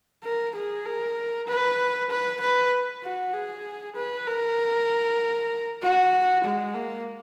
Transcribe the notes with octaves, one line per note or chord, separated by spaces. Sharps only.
A#4
G#4
A#4
B4
B4
B4
F#4
G#4
B4
A#4
F#4
G#3
A#3